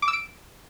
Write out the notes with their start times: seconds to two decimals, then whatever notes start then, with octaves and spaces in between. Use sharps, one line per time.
0.02 D6
0.08 E6
0.13 D7